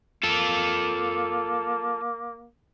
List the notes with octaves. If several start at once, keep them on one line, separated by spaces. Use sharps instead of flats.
A#3 F4 A4